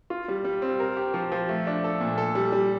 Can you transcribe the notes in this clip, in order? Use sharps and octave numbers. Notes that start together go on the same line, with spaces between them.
F4
G3
G3
C4
A#4
G4
F3
F3
A3
D4
A4
A#2
A4
G3
G3